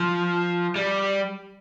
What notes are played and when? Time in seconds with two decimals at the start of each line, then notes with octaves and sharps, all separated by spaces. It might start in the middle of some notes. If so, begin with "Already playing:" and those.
Already playing: F3
0.76 G3